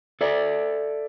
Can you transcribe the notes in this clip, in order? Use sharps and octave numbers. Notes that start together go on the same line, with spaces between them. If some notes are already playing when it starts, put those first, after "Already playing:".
A4 D5 E5